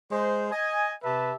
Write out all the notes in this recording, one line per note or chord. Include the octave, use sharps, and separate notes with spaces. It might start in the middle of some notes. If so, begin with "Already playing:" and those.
G#3 C5
D#5 G#5
C3 G4 B4 E5 A5